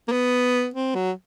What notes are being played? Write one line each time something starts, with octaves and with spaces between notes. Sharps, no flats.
A#3
B3
C4
F#3